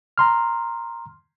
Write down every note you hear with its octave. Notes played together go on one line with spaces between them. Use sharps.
A#5 C6 F6